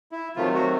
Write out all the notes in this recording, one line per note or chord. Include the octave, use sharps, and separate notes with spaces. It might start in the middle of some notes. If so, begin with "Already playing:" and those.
E4
C3 D#3 F3 F#3 A3 F4
F#3 F#4